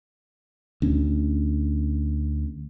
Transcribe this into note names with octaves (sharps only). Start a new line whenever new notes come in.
D2 C#4